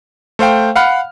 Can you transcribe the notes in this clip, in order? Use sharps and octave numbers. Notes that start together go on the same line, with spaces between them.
A3 C5 F5 G5
F5 F#5 B5 F6